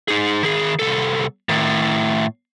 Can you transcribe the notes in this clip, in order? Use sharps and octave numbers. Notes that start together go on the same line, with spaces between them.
D#4 G#4
D#3 G#4
C2 A4
A2 D#3